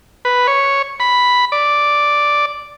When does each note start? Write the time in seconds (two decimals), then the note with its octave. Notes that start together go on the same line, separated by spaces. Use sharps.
0.25 B4
0.47 C#5
1.00 B5
1.52 D5